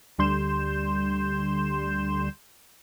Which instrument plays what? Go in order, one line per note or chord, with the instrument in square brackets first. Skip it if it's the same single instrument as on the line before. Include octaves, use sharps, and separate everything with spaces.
[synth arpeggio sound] D2 D3 G3 C6 G6 E7